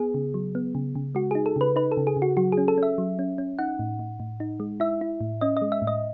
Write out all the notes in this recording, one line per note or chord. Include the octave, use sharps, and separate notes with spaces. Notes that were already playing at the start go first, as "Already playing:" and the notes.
Already playing: B3 G#4
C#3
F#3
B3
C#3
C#3
G#3 F#4
D#4 G#4
A4
C#3 B4
D#4 B4
A4
C#3
G#4
C#3
F#4
F#3 F#4
G#4
C#4
A4
C#4 E5
F#3
C#4
C#4
D#4 F#5
A2
A2
A2
D#4
G#3
E4 E5
E4
A2
C#4 D#5
D#5
G#3
E5
A2
D#5